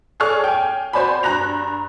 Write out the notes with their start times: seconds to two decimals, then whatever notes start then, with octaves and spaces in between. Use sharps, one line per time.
0.20 G#4 A4 C#5 D5 C#6 F6
0.44 G5 G#5
0.93 F#4 C5 D5 G#5 B5
1.23 G2 A#5 F#6 A#6 F7